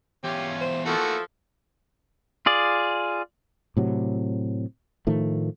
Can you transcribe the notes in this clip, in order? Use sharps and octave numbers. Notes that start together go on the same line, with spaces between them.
E2 C#4 F4 G4
C5
E3 F3 A3 A#3 F#4 A4
F4 G#4 D5
A2 C3 F#3
A2 D#3 F3 A3